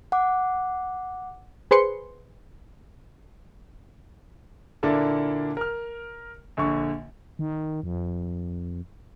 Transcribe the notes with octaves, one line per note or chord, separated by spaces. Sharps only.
F#5 D6
G#4 B4 C5 C6 C#7
A#2 D3 A#3 D4 E4 A4
A#4 F6
A#1 D3 C#6
D#3
F2